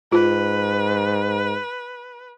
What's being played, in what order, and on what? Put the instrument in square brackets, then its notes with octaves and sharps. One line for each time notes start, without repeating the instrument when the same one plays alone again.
[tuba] G#2 [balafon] F4 [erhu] B4